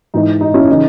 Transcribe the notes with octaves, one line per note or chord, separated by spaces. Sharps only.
G#2 E3 D#4
D#4
C#4 E4
C#3 E3 D#4